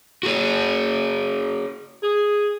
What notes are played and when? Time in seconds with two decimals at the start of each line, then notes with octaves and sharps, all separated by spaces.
0.23 F#4 G#4 C#5
2.03 G#4